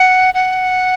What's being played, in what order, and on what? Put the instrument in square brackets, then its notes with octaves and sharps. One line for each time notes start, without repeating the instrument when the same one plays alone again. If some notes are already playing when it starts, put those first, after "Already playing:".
Already playing: [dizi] F#5
F#5